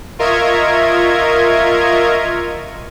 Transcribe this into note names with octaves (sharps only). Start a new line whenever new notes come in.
F4 A#4 D#5 E5 C#6 G#6